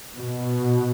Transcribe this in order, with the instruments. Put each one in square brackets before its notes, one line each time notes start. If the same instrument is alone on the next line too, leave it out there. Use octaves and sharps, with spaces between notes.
[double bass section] B2